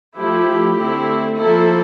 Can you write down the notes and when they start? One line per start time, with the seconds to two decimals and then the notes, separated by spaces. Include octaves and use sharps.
0.17 F3 A3 E4 G4
0.77 D3 A3 C4 E4
1.39 F3 A#3 E4 A4